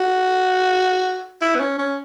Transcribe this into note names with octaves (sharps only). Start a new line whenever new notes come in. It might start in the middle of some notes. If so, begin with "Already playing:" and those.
Already playing: F#4
E4
B3
C#4
C#4